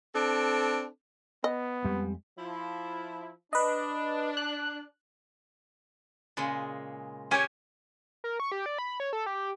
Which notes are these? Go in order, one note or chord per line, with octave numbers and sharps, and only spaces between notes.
C4 D4 A4
B3 D#5
F2 G3 G#3 C4
F3 E4
D4 B4 D#5
F#6
A#2 C#3 G#3
C#4 G4 C#5 G#5
A#4
C#6
G4
D5
B5
C#5
A4
G4